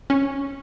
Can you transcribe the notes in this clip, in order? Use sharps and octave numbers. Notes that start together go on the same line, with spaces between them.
C#4